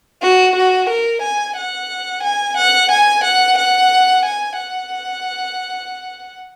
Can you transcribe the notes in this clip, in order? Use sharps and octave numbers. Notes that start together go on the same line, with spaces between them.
F#4
F#4
A#4
G#5
F#5
G#5
F#5
G#5
F#5
F#5
G#5
F#5